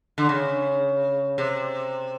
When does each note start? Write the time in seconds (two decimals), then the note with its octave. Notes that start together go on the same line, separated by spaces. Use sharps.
0.18 D3
0.29 C#3
1.38 C3